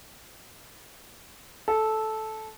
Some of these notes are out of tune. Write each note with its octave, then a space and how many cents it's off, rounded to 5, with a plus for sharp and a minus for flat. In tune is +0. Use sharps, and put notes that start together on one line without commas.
A4 -10